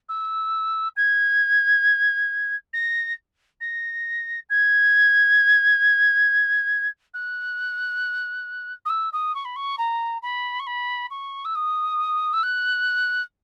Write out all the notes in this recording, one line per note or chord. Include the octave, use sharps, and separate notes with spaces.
E6
G#6
A#6
A#6
G#6
F#6
D#6
E6
D#6
C#6
B5
C#6
A#5
B5
C#6
B5
C#6
E6
D#6
E6
F#6